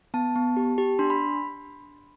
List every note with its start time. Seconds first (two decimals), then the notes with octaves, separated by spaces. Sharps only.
0.14 B3 A5
0.35 B3
0.57 G4
0.78 G4
0.99 D4 C6
1.10 B5